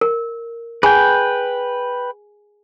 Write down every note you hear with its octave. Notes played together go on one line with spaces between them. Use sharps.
A#4
G#4 B4 G5 G#5